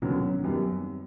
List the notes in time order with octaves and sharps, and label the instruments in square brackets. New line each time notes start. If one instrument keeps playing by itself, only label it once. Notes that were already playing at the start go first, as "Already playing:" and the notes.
[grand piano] D#2 D3 F#3 B3 [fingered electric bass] C#4
[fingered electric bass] C#4
[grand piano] F#2 D#3 G3 B3 [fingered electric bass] C4